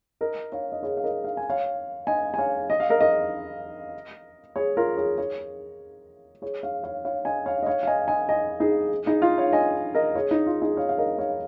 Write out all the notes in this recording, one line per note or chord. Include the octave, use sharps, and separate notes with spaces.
A#4 D#5
C#5 F5
D#5
G#4 C#5
F5
A#4 D#5
F5
G#5
C#5 F5
D#5 G#5
G#5
C#5 F5
D#5
F5
A#4 D#5
A#4 D#5
G#4 C#5
F4 A#4
G#4 C#5
G#4 C#5
G#4 C#5
C#5 F5
C#5 F5
C#5 F5
D#5 G#5
C#5 F5
D#5
C#5 F5
F5
D#5 G#5
D#5 G#5
D#5 G#5
D#4 G#4
D#4 G#4
F4
C#5 F5
D#5 G#5
A#4 D#5
G#4 C#5
D#4
F4
D#4 G#4
C#5 F5
F5
A#4 D#5
C#5 F5